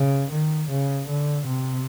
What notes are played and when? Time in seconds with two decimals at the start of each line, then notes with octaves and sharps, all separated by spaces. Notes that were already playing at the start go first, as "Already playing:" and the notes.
Already playing: C#3
0.31 D#3
0.70 C#3
1.08 D3
1.46 C3